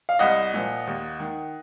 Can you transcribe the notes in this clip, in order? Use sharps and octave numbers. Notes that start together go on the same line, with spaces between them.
F5
C2 D#5 F#5
A#2 F3
D#2
D#3